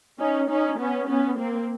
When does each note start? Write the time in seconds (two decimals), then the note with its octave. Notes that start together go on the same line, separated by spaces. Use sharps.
0.19 C#4 D#4
0.48 C#4 D#4
0.78 B3 C#4
1.08 B3 C#4
1.38 A#3 C4